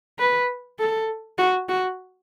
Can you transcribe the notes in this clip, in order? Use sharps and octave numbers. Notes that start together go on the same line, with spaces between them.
B4
A4
F#4
F#4